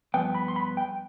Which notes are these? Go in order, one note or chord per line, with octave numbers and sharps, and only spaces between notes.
G2 F3 B3 G5
B5
C6
B5
G5